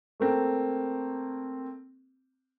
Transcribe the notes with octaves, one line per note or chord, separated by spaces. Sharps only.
A3 A#3 C4